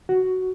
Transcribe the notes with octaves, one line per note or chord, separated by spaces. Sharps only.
F#4